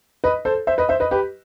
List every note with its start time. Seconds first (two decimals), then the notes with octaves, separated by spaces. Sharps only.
0.24 B4 D#5
0.45 A4 C5
0.67 C5 E5
0.78 B4 D#5
0.89 C5 E5
1.00 B4 D#5
1.11 G4 B4